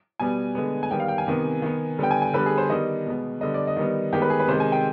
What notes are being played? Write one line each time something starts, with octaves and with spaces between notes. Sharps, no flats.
B2 G3 B3 G#5
D3 G#3 B3
G#5
D#3 G3 B3 G5
F5
G5
G#5
C3 D#3 B3
D#3 B3
D3 G3 B3 G5
G#5
G#5
D3 G3 B3 B4
G#4
C5
D#3 G3 B3 D#5
B2 G#3 B3
D3 G3 B3 D#5
D5
D#5
D#3 G3 B3
D#3 G#3 B3 G4
B4
G#4
B4
C3 D#3 G#3 C5
G#5
G5